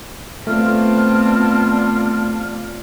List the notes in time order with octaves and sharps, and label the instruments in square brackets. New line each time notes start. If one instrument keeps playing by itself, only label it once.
[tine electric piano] A3 [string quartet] B3 C4 A5 [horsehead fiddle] F4 D5 [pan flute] F6